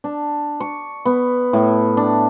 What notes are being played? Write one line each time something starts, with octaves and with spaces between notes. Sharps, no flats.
D4
C#6
B3
A2
D4